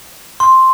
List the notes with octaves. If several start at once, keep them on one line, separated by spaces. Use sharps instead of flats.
C6